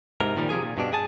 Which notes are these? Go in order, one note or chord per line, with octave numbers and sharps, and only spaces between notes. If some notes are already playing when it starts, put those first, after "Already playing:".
G#2 C3 A#4
A#2 D#3 F3 G3
C3 F3 G#4 G#5
A#2
G2 B2 D4
G#4 G#5 A5